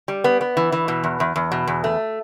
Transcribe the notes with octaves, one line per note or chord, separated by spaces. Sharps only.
G3
B3
B3
E3
E3
B2
E2
E2
E2
B2
E2
A3